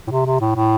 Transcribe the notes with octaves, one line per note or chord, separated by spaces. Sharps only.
A2
C3
C3
A2
A2